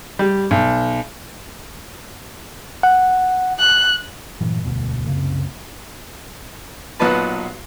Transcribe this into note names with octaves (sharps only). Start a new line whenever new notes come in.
G3
B1
F#5
F#6
G2 A#2 E3 F#3
E1 D2 G2 B2
C2 F#2 C#3 A#3
B1 A#2 B3 D#4 B4 A5